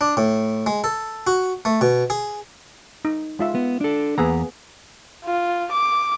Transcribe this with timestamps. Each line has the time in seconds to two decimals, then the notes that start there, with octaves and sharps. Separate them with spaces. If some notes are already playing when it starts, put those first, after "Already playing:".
0.01 D4
0.17 A2
0.66 G#3
0.84 A4
1.27 F#4
1.65 A3
1.81 B2
2.10 G#4
3.05 D#4
3.39 G#3 F4 E5
3.55 B3
3.81 D4 A4
4.18 E2 A#3 B3 G#4 A#5
5.25 F4
5.72 D6